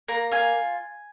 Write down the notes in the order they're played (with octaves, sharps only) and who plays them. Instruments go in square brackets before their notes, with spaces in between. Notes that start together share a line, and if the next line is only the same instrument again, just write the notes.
[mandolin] A#3 A#5
F4 G#5